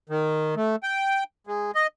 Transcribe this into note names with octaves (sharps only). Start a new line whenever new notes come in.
D#3
A3
G5
G#3
D#5